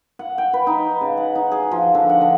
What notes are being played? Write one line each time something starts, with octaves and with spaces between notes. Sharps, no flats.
F#5
G5
B4
D#4
C#3
F#5
D#4
G#4
F3
D3
F#5
D3